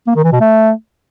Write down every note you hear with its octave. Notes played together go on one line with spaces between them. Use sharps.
A#3
D#3
E3
B2
A3